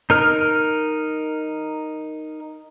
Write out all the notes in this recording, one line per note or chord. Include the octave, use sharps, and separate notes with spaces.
D#4 A#4 F6